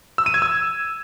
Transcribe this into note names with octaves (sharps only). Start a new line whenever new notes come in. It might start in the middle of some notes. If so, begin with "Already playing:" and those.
E6
D#7
G#6
E6